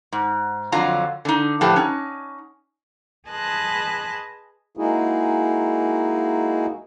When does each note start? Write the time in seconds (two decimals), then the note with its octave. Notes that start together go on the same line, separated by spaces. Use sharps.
0.12 G#2
0.72 F2 D3 F#3 F4 A#5
1.25 D3 D#4
1.61 A2 D3 F3 B3 G4 A4
1.76 C#4 D#4
3.29 G#4 B4 D#5 A5 C6 F#6
4.77 G#3 A#3 D#4 E4 F#4 G#4